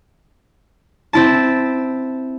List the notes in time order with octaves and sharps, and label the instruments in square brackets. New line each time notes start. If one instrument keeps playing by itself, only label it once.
[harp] C4 E4 A5